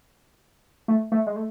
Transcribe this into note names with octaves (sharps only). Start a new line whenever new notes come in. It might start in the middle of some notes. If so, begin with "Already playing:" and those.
A3
A3
G#3
A3